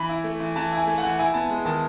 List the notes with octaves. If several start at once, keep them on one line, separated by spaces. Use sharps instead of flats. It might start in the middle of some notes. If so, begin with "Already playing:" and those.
Already playing: E3 B5
E4
A3
E3
E3 A5
E4
G#5
A3
F#5
E3
E4 G#5
B3 A5
G#3
D#3 A5